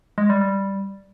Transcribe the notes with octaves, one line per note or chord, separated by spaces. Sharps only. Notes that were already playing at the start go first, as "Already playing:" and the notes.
G#3
G3
G3